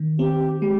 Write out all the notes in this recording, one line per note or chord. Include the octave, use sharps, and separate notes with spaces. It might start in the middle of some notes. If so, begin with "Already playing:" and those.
Already playing: D#3
C4 G4
G#3 G4